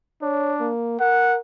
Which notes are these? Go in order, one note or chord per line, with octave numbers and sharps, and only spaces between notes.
D4 C#5
A#3
A#4 F#5